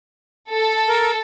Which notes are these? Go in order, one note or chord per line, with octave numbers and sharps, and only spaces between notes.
A4
A#4